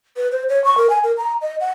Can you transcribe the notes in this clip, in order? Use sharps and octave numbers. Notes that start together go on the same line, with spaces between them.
B4
C5
C#5
C#6
A#4
G#5
A#4
A#5
D#5
F#5